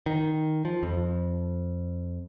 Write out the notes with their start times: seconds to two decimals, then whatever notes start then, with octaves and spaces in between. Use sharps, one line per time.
0.06 D#3
0.65 F3
0.83 F2